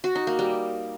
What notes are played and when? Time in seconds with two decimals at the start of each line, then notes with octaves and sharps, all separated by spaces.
0.04 F#4
0.15 D#4
0.27 A#3
0.39 G3